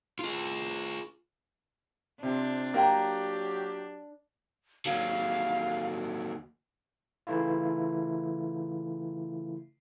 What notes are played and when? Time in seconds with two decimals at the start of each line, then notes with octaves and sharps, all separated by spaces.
0.19 F4 G#4
2.23 C3 C4 D4 F4 C5
2.74 F#3 A#3 G4 A#4 G5 A#5
4.86 D#2 F#3 F5
7.27 C#3 E3 A3 E4 F4